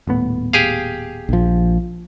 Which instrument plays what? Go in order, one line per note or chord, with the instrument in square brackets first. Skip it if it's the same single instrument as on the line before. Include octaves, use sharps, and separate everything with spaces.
[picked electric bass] D#1 A2 B3
[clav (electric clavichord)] G4 G#4 F5
[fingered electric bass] A#1 F3